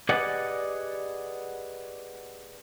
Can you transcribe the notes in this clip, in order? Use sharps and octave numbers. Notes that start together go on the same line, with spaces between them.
G4 G#4 B4 D5 D#5 F#5